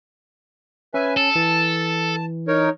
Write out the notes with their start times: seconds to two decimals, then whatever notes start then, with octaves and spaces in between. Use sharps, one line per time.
0.94 C#4 B4 E5 G#5
1.17 A4 A5
1.36 E3
2.48 D#4 A#4 C#5